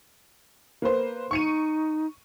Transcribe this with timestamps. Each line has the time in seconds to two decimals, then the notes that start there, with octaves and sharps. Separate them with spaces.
0.82 A#3 B4 C5
1.31 D#4 C#6 C#7 D#7